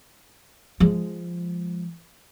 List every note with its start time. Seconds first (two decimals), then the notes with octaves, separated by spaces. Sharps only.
0.80 F3 G#3